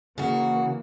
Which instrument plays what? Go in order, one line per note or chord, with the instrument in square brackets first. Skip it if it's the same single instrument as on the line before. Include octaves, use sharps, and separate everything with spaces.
[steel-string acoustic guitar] C#3 F#4 [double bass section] E3 A#3